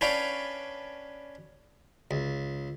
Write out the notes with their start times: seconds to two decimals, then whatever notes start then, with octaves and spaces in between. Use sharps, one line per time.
0.01 C#4 D4 B4 F5 G5
2.11 C#2